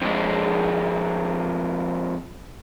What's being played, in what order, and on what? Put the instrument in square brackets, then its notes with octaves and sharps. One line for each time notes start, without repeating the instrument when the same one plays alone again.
[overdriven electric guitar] F2 G#3